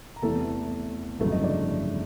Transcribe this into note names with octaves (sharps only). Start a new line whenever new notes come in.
A#5
E2 C3 E3 A3 A4 A5
G1 F2 C#3 F#3 A3 E4 E5
D#4 D#5
D4 D5